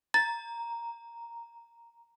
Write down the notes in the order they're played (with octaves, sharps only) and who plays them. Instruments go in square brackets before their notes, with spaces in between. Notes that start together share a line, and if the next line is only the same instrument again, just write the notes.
[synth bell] A#5 [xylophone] A6